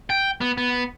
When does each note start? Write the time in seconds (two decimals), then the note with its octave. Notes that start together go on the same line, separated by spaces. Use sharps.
0.10 G5
0.41 B3
0.58 B3